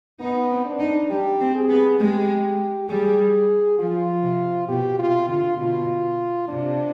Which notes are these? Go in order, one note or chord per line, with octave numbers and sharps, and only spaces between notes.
B3 D#4
C4
D4
D#4
G3 G4
C4
G#4
B3
G#3 G4
G3 G#4
F3 F4
C3
B2 G4
C3 F4
D3 F4
B2 F4
C3 D4